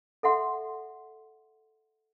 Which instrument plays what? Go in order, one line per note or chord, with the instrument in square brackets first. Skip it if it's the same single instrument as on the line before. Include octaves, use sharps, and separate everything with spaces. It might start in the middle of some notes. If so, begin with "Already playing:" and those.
[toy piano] A4 E5 F#5 C6